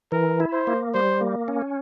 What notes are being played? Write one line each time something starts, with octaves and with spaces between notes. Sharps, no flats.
E3 A#4
E4
C5
A#3
G3 C5
A#3
C#4